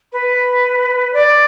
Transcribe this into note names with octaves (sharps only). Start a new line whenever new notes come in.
B4
D5